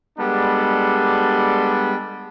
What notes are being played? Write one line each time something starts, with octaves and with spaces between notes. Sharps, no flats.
G3 G#3 B3 D4 A4